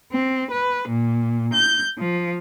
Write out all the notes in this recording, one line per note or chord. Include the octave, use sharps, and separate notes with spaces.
C4
B4
A#2
G6
F3